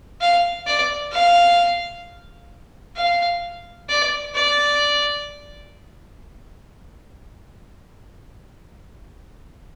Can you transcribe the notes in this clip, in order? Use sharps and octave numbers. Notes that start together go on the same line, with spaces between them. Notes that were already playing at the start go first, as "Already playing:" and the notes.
F5
D5
F5
F5
D5
D5